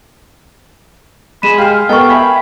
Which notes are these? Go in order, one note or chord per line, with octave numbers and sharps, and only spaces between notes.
G#3 G#4 B5 D#7 E7
G4 F5 G5 F6
B3 A4 A#4 D#5 G5 C#6
E5 G#5 B5